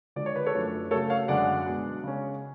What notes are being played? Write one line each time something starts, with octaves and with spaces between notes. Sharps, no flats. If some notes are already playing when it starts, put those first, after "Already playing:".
D3 F3 G#3 D5
C#5
B4
A4 C#5
F#2 F3 A3 D4
C#3 F#3 A3 A4 C#5
C#5 F5
F#2 D3 G#3 D4 D5 F#5
B2 G#3 D4
C#3 G#3 C#4